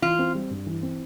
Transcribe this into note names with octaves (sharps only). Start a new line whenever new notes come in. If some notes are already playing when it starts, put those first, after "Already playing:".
E3 F4
C4
G3
G2
E3
C4